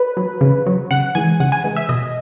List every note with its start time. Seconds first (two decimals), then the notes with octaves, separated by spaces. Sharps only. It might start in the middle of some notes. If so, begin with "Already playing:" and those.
Already playing: B4
0.17 F#3
0.41 C#3
0.66 F#3
0.91 C#3 F#5
1.15 E3 G#3 G#5
1.40 C#3 F#5
1.52 G#5
1.64 E3 G#3
1.76 E5
1.89 B2 D#5